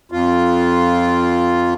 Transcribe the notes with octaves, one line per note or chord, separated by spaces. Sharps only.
F2 F4